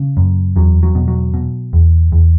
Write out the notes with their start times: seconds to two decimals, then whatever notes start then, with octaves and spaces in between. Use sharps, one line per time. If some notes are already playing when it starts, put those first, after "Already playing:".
Already playing: C#3
0.17 F#2
0.56 E2 F#3
0.83 F#3
0.95 B2
1.08 F#3
1.34 B2
1.73 E2
2.12 E2